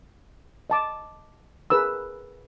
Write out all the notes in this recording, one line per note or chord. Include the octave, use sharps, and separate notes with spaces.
D#5 A5 D6
G#4 A#4 B4 B5 E6